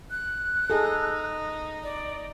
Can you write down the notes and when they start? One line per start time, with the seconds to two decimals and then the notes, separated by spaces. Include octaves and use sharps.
0.11 F#6
0.70 D#4 G#4 A4
1.83 D5